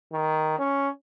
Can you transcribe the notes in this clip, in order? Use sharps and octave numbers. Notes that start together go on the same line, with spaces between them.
D#3
C#4